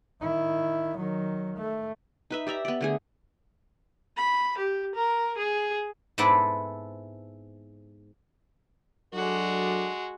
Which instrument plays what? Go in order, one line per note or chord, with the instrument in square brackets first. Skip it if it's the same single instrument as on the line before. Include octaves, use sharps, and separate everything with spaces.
[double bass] D#3 E4
D#3 F#3
A3
[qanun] D#4 B4 E5
G4 D5 E5 A#5
B3 D5
D3 A3 G#4
[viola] B5
G4
A#4
G#4
[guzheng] G#2 B3 C4 E4 A4 D5
[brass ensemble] F#3 D4 A4 [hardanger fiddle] G#3 F#4